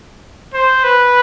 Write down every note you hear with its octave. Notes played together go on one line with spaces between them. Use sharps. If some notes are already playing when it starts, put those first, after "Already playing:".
C5
B4